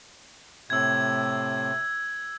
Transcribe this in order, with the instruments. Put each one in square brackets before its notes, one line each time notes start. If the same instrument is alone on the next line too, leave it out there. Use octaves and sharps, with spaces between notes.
[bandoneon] A2 C3 [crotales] E6 G#6